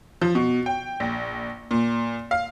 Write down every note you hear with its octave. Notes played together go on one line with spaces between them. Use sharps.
F3
B2
G5
A#1
A#2
F5